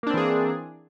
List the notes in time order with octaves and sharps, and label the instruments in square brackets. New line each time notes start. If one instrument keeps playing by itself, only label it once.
[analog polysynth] A#3
D4
C4
E3
G#4